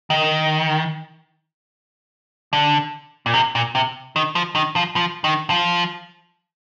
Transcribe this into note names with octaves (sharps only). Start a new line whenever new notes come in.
D#3
D3
A#2
C3
A#2
C3
D#3
F3
D#3
F3
F3
D#3
F3